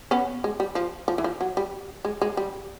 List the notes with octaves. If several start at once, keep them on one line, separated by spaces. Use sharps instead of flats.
B3 C#4
G#3
G3
F3
F3
E3
F3
F#3
G3
G#3
G#3
G3